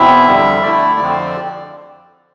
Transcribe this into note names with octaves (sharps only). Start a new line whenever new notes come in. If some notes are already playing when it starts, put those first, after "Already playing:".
Already playing: E2 B2 C4 E4 E5
F2 D3 G3
D3 A3 E4 D5
F2 D3 F3 C4